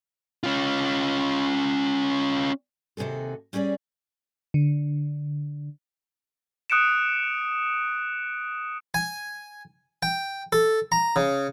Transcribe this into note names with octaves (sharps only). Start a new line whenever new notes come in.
C#4 F4
D#2 C3 F#4 G#4 A4
G3 C#4 G#4 C#5 D5
D3
D#6 F#6 C#7 D7 E7
G#5
G5
A4
A#5
C#3